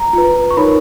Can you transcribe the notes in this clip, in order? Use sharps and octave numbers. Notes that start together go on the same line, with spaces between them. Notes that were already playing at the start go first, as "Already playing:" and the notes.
Already playing: A#5
F4 B4
C#6
D#4 A#4 C#5 B5